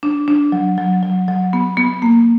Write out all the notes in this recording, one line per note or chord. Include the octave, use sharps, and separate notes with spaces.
D4
D4
F#3
F#3
F#3
F#3
B3
B3
A#3